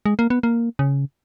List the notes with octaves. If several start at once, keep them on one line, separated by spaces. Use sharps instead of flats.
G#3
A#3
B3
A#3
C#3